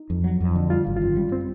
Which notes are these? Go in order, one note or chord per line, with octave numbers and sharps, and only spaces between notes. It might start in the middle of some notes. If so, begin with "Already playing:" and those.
Already playing: D#4
F2
F#3
F2
D3
G3 F4
G#1
F#2 F4
G3
C4